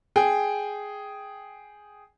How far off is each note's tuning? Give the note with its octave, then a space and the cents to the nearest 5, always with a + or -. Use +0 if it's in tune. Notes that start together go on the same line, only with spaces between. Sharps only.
G#4 +0 G5 +0